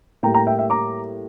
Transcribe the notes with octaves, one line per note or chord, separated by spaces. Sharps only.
A2 G3 A#3 G5 A#5
G5 A#5
E5 G5
E5 G5
A#5 D6